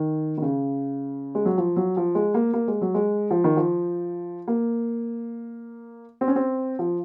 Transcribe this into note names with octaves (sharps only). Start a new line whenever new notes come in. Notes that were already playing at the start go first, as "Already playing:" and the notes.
Already playing: D#3
D#3
C#3
G#3
F#3
F3
F#3
F3
G#3
A#3
A#3
G#3
F#3
G#3
F3
D#3
F3
A#3
C4
C#4
C4
F3